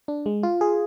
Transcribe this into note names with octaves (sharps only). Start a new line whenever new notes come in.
D4
G#3
F4
G#4